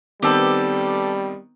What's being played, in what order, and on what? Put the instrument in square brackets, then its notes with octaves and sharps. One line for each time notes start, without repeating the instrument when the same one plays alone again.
[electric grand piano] D#3 B3 C4 [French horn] G3 [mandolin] G4 A4 B4